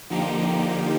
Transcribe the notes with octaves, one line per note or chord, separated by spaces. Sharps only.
D3 F3 A#3 D#4 G4